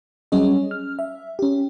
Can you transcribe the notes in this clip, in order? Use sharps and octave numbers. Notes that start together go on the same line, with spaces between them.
F#3 G3 C#4 G#4 C#5 D#5
F6
E5
C#4 G4